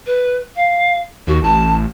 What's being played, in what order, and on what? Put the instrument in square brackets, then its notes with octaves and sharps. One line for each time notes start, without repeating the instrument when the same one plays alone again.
[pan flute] B4
F5
[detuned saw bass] D#2 [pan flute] F#4
[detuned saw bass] A1 [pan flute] A5